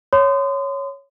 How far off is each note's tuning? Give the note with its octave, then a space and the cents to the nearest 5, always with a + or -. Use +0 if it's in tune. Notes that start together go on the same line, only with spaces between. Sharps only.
C#5 +0 C6 -35 D#6 -35